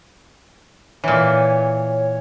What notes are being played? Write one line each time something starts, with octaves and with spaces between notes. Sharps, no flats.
A#2 E3 C#5